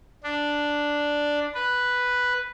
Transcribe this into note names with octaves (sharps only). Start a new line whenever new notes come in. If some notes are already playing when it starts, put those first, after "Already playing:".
D4
B4